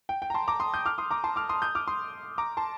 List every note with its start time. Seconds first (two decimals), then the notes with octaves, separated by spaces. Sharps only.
0.09 G5
0.22 G5
0.30 A#5
0.34 A5 C6
0.48 A#5 D6
0.60 C6 D#6
0.74 D#6 G6
0.86 D6 F6
0.98 C6 D#6
1.11 A#5 D6
1.24 A5 C6
1.36 D6 F6
1.49 C6 D#6
1.62 D#6 G6
1.75 D6 F6
1.87 C6 D#6
2.38 A#5 D6
2.57 A5 C6